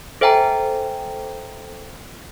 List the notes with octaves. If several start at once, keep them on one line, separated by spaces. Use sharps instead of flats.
A4 C5 E5 G5 G#5 A#5